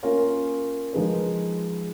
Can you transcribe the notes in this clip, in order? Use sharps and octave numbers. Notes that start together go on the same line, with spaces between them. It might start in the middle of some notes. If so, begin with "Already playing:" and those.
A#3 C#4 F4 A#4 C#5
F3 G#3 D#4 G#4 B4